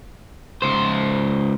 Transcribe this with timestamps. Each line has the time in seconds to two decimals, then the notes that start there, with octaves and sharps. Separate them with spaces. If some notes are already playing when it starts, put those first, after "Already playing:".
0.62 C#2 C5